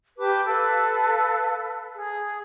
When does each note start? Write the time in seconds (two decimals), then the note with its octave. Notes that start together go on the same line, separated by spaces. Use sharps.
0.18 G4 B4 A5 D6
0.46 A4 B4 F5 E6
1.96 G#4